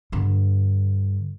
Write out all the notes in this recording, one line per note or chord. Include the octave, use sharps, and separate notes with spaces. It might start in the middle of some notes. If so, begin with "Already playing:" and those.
G2 D3